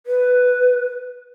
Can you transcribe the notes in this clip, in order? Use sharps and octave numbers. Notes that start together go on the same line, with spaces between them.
B4